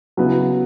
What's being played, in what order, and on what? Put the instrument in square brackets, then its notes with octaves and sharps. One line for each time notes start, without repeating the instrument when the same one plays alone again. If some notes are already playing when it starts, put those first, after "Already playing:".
[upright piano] C#3 F#3 B3 E4